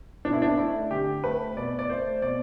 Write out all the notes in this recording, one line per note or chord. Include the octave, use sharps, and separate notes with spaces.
B2 D4
E4
D4
A3 E4
D3 G4
A3 B4
B2 D5
D5
A3 C5
B2 D5